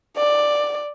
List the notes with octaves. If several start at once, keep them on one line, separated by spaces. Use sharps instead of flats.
D5